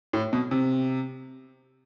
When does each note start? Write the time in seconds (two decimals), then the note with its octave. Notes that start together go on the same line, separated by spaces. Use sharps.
0.13 A2
0.33 B2
0.51 C3